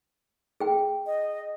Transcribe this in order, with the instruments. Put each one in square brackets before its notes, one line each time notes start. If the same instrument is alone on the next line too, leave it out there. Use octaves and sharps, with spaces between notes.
[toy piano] G#4 G5
[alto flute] D#5